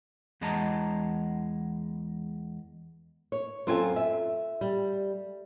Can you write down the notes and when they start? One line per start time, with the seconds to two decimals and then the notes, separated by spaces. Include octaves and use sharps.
0.41 E2 G#3 B3 D#5 A5 A#5
3.32 C#5
3.67 F#2 C4 F4 A4 G#5
3.96 E5
4.61 G3